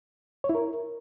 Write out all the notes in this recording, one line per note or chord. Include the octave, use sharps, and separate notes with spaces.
C#5
E4
A#4